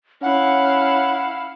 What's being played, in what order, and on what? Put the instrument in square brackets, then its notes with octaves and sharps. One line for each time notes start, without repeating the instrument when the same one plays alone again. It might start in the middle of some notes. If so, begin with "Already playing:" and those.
[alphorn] C#4 [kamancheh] E4 F5 [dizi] F#5